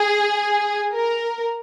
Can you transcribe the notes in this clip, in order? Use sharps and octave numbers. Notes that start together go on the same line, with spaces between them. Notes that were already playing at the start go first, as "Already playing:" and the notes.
Already playing: G#4
A#4